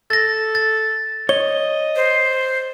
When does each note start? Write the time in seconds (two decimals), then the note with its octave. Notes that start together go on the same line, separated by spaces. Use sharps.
0.10 A4 A6 A#6
0.55 A6
1.29 C#5 D#5 G7
1.96 C5